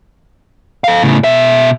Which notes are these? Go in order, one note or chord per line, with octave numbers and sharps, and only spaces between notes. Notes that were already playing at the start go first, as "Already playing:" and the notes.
A4 F5
A2 C#3
B2 E5